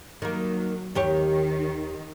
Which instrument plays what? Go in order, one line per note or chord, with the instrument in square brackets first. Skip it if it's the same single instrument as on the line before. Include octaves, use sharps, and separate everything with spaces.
[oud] D#3 A#3 [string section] F#3
[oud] D#2 G4 C#5 [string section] D#3